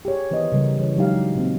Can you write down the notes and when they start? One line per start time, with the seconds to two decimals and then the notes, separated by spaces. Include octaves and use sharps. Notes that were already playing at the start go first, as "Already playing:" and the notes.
0.05 G4 G#4 C#5
0.31 D#3 E3 B3 C5 D#5
0.52 C#3 G3 A#4
0.78 E3 C#5
0.97 F#3 G#3 D4 D#4 G4 F5
1.35 A#2 C4